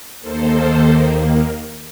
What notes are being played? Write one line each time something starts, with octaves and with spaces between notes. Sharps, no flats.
D#2 D#3 A#3 A4 C5